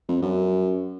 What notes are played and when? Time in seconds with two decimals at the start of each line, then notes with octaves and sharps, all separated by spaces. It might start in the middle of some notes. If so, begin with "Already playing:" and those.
0.08 F2
0.22 F#2